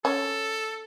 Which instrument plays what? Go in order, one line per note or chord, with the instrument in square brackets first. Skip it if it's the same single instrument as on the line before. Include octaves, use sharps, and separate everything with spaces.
[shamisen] C#4 [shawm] A4